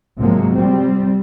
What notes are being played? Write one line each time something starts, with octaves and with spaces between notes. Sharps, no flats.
G#2 C3 F3 F#3 G#3 A#3
G3 C4